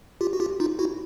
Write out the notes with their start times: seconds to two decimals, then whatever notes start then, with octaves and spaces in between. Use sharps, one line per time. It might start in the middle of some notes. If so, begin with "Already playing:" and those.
0.21 F4 G4
0.33 F#4
0.40 F4 G4
0.60 D#4 F4
0.79 E4 F#4